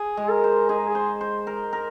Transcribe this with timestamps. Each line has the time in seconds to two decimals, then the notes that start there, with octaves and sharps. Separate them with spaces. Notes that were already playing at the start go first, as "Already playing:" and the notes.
Already playing: G#4
0.17 G#3
0.30 A#4
0.44 C5
0.69 D#4 G#4
0.88 G#4
0.95 C5
1.21 C5
1.47 A#4
1.73 A#4